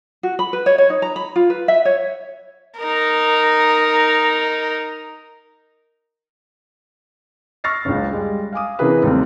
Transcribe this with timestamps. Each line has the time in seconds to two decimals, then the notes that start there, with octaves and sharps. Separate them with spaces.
0.23 F#4
0.39 B5
0.53 B4
0.66 C#5
0.78 C#5
0.90 D#4
1.02 A#5
1.16 B5
1.36 F4
1.50 B4
1.68 E5
1.85 C#5
2.79 D#4 A#4
7.64 C#6 E6 F6 A6 A#6 C7
7.85 F#1 C#2
8.13 G3 G#3
8.53 F5 G#5 D6 D#6
8.79 C3 E3 C#4 G#4 A#4 B4
9.03 D#2 C3 G3 A3 C4